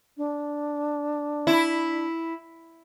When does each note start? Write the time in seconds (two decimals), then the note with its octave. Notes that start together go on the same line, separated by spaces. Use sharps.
0.17 D4
1.47 E4